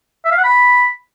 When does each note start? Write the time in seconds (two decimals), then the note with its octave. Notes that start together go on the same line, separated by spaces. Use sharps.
0.25 E5
0.31 F5
0.38 F#5
0.44 B5